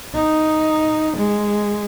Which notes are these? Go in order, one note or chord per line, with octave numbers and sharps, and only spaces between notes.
D#4
G#3